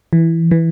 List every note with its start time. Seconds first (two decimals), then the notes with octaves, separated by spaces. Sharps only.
0.13 E3
0.51 E3